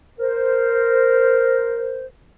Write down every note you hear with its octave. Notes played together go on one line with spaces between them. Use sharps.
A#4 C5